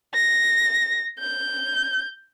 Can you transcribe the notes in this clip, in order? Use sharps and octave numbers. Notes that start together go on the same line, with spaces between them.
A#6
G6